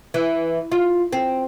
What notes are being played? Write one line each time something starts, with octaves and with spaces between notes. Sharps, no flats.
E3
F4
C4